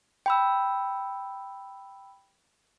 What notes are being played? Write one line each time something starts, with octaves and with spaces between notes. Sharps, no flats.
G5 B5 E6